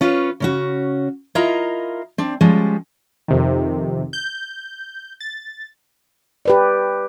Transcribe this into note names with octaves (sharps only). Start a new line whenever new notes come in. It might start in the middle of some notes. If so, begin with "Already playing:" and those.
C#4 F4 B4 C#5
C#3 C#4 F#4
E4 F4 A#4 D#5 A#5
C4 D4
F3 G3 G#3 C#4
F2 C3 D#3
G6
A6
G4 B4 D5